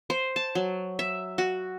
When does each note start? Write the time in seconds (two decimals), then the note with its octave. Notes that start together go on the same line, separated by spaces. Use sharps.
0.10 C5
0.36 A5
0.55 F#3
0.99 E5
1.38 F#4